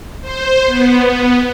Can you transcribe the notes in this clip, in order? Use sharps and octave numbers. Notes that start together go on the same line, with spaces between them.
C5
B3